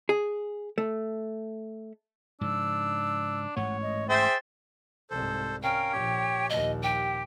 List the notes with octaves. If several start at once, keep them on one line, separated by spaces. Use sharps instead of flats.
G#4
A3
G#2 C#3 F3 D4 E6
A1 G#2 A3 C#5 F#5
D#5
G#4 C5 E5 G5 A6
C2 G#2 A4 C5
C#4 A#4 F5 G5
A#1 G4 C#5
A#1 D#2 D#5
G4 G5